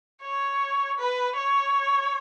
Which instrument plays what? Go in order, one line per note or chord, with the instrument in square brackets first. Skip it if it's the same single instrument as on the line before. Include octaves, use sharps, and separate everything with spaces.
[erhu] C#5
B4
C#5